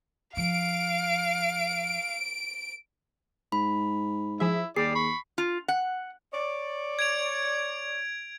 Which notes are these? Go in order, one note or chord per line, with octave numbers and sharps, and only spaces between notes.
F3 F5 D7
G#2 B5
F3 E4 G#4 E5
D#2 G3 G#4 D5 C7
B5 C#6
F4
F#5
C#5 D5
G#6 D7 F7